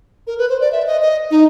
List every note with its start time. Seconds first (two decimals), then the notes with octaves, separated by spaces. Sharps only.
0.27 A#4
0.38 B4
0.49 C5
0.60 D5
0.72 E5
0.87 D#5
1.01 D#5
1.31 D#4